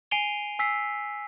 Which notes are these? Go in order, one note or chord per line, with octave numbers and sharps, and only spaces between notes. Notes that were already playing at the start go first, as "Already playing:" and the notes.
G#5 C7 D7 D#7 F7 G7
G#5 E6 B6 C7